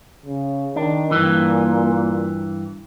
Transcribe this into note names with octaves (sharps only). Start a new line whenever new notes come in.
C#3
D#3 D4
G2 A#2 E3